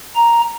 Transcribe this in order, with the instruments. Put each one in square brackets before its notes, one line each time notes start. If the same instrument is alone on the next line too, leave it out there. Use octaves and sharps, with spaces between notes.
[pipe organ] A#5